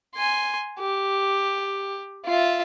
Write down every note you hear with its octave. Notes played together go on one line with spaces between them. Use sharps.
G#5 C6
G4
F4 E5